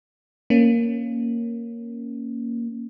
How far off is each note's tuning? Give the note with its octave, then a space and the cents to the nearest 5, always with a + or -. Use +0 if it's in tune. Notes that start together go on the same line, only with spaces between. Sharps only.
A#3 +0 C#4 +0